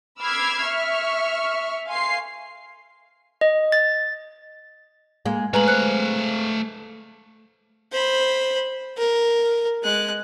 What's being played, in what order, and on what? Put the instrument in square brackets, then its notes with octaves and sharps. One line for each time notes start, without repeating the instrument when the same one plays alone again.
[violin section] B5 D6 E6 F6 G#6 C7
E5 C#6 F6
F5 G#5 C6 C7
[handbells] D#5
A6
[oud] G#3 A#3
[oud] G#3 [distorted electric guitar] A3 F5 [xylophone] B4 A#5 F#7
[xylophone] C5 F#6 C#7
[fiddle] C5 B5
A#4
G#3 F#6